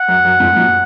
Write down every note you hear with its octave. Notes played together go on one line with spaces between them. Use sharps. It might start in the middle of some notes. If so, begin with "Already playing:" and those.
Already playing: F#5
F#2
F#2
F2 G#2
F#2 A#2